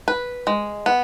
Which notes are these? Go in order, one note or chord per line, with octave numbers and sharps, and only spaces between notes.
B4
G#3
B3